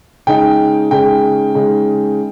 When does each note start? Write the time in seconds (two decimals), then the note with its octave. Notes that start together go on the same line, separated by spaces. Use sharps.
0.27 C#3 G#3 D#4 G5
0.91 C#3 G#3 D#4 G5
1.54 C#3 G#3 D#4